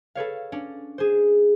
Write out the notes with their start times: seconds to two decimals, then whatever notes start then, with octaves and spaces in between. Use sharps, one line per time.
0.15 A4 B4 C#5 F5
0.52 C#4 D4
0.98 G#4 C5